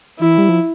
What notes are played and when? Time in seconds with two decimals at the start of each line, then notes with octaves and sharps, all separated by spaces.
0.19 E3 E4
0.38 G3
0.49 F3